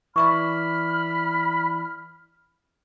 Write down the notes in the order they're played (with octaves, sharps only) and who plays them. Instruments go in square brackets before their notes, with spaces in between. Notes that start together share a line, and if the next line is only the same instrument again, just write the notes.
[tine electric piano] E3 E4 D5 [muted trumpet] B5 [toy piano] C#6 [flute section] F6